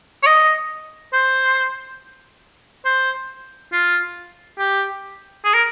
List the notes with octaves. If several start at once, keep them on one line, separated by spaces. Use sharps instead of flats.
C#5
D#5
C5
C5
F4
G4
G#4
A#4